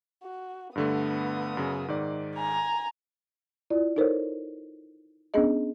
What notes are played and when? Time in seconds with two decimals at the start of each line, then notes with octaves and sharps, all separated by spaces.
0.24 F#4
0.75 G2 D3 A3 B3 D#6
1.57 F#2 C#3
1.88 G#2 D#3 D5
2.36 G#5 A#5
3.70 E4 F4 D5
3.96 D#4 A4 A#4 C5 C#5
5.34 B3 C#4 D4 G#4 D#5